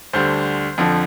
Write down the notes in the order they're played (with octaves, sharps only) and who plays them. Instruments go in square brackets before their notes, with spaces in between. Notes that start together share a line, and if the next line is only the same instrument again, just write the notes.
[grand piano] D2 D3 G3 C5
F2 D3 F3